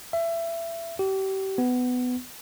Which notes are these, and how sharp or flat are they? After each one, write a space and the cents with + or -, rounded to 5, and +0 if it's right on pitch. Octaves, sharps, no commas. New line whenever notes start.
E5 +25
G4 -30
B3 +15